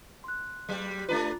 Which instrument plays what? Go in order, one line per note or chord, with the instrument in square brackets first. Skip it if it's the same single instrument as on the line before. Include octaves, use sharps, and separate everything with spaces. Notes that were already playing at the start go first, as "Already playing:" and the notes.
[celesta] C6 F#6
[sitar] F#3 G3
[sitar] A3 D4 B4 [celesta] F4 A#5 A6